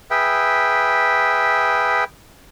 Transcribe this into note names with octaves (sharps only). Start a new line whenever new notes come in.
G#4 B4 E5 G5